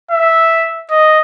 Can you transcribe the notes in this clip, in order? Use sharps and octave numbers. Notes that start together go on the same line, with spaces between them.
E5
D#5